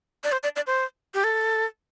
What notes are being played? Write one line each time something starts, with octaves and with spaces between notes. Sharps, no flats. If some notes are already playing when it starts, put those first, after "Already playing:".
D5
C5
D5
D5
C5
G4
A4